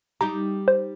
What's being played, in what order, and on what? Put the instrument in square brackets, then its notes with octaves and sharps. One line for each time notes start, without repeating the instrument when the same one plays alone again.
[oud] G3 D#4 G4 [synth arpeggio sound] A#5
[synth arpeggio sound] C5